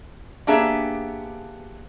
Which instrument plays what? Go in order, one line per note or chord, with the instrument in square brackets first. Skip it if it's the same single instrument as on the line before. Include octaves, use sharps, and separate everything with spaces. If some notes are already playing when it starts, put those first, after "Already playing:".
[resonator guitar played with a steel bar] A#3 B3 D4 G4 G#4 E5